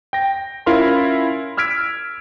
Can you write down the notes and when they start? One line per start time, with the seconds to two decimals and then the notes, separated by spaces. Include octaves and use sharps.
0.13 G5 A#6
0.66 C#4 E4 F4 A#4 F5 C6
1.57 E6 F6 G#6 B6 D7